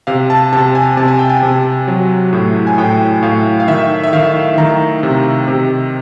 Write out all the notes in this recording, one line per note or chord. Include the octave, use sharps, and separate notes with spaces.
C3 F5
A5
C3 A5
G#5
C3 A5
G#5
G5
G#5
C3
F#3
A2
G#5
A2 G5
A2 F5
F5
D#3 E5
E5
D#3 F5
D#3 A#5
C3
C3